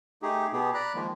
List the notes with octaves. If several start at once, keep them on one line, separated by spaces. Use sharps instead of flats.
A3 D#4 G4 G#4
B2 B3 G4 G#4
D5 A#5 B5 F#6
D#3 F3 G#3 A#3